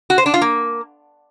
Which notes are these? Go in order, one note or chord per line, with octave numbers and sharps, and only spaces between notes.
F#4
C5
D4
F4
A#3